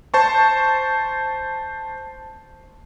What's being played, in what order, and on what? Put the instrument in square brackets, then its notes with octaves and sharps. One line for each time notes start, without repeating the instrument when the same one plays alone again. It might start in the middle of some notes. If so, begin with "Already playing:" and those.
[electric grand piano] C5 A5 C#6